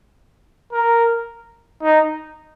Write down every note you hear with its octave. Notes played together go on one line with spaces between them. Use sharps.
A#4
D#4